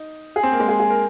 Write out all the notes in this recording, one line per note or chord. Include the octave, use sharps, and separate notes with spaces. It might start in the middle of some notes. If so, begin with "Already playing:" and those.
Already playing: D#4
G#4
C4
A#3
G#3
G#4
G#4
A#4